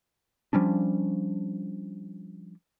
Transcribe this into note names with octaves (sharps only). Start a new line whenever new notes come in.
F3 G3 C#4 D4